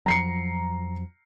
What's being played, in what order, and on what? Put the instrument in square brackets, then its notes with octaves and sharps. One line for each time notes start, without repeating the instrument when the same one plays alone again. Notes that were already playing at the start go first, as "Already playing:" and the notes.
[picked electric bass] F2 F3 F#3 [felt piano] A#5 C7 C#7